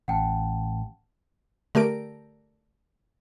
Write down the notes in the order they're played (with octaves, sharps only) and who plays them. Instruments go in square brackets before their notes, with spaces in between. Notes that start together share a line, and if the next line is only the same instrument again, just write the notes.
[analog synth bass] A1 [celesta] F#5 G5 A5
[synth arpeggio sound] D3 A3 G4 A#4 D7